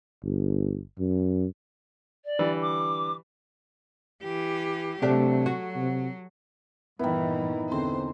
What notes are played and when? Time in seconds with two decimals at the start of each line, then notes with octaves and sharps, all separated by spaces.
0.24 G1
0.99 F#2
2.25 D5
2.39 D3 E3 G3
2.62 D6
4.23 E3 G4
5.02 C3 F#3 A3 D4 G4
5.46 F#4
5.76 C3
6.99 G2 A#2 D#3 E3 B3 E4
7.72 E2 D3 C4 C5 C6